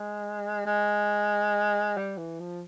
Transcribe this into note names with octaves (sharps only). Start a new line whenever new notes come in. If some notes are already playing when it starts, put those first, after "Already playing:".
Already playing: G#3
G#3
G3
E3
F3